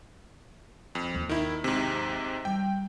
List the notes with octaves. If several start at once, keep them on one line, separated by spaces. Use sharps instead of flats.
F2
D#2
D#3 E4
G#2 C3
G3 G5